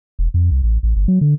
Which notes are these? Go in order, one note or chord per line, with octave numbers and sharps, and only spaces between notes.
E1
F2
C2
A1
A1
G1
F#3
D3